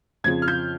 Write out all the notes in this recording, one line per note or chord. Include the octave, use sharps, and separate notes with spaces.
F2 C#3 F3 G#6
F6
G6